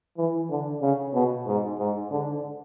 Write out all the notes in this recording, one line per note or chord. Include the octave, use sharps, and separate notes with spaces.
E3
D3
C#3
B2
G#2
G#2
D3